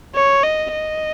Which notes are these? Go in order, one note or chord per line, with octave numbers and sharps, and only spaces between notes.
C#5
D#5
D#5